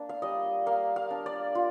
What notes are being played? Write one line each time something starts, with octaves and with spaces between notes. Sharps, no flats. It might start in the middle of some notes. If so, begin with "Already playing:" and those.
Already playing: A#3 D4
F5
G3 D#5
A#3 F5
F5
D4
D5
F4